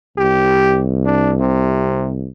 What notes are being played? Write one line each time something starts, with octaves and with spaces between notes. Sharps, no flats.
C2 G4
D4
C3